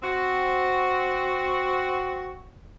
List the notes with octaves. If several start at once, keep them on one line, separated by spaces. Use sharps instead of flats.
C4 F#4